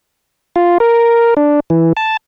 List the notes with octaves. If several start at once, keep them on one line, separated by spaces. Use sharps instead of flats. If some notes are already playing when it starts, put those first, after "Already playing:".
F4
A#4
D4
E3
A5